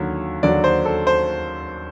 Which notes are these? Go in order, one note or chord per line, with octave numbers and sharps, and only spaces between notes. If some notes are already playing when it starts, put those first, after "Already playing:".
Already playing: D#2 D3 F#3
D#2 D3 F#3 D5
C5
A4
C5